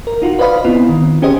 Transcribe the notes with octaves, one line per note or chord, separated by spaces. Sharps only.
A#4
D#4 F4 F#4
B4 C5 D5 D#5 F5 B5
B3 C4 E4 F4
D#3
C#4 G4 G#4 C5 D#5